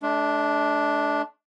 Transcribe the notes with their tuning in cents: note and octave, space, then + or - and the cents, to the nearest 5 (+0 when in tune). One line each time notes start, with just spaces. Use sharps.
A3 -40 D4 -5